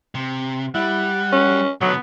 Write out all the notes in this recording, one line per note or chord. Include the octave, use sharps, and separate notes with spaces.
C3
G3 E4 F#5
C#4
B2 D3 F#3 B3